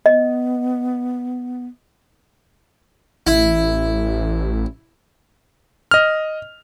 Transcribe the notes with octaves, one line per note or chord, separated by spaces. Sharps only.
B3 D#5
A1 E4
D#5 F6